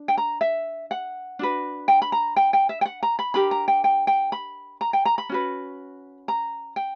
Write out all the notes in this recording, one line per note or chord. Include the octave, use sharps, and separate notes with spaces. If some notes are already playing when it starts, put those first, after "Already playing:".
Already playing: D4
G5
A#5
E5
F#5
D4 F#4 B4
G5
B5
A#5
G5
G5
E5
G5
F#5
A#5
B5
D4 G4 A#4 B5
A#5
G5
G5
G5
B5
A#5
G5
A#5
B5
C#4 F#4 B4
A#5
G5